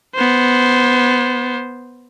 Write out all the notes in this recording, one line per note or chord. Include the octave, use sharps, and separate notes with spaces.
B3 C5